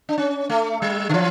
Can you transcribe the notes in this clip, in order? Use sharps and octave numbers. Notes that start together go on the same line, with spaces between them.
D4
C#4
A3
G3
D3
E3